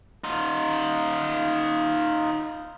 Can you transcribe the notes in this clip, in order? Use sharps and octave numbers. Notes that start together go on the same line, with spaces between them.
D#4 F4